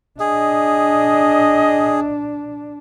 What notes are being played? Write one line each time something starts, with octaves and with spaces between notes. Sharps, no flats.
D4 G#4 D#5